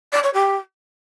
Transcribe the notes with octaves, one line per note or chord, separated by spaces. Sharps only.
D5
C#5
G4